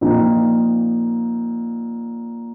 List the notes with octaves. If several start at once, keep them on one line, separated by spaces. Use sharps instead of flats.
A#2 F3 C4 D#4